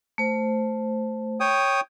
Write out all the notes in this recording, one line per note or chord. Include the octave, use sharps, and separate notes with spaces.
A3 C5
C#5 G5 D#6